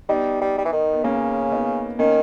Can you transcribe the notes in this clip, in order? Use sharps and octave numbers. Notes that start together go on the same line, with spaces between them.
G3 B3 D#4
G3
G3
E3
D#3
B3
C#3 A#3 C#4
B3 D#4
D#3 A#3 C#4